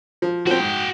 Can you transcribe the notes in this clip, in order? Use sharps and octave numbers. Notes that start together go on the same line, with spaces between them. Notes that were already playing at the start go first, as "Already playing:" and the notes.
F3
F3 C4 F#4 G5
G#2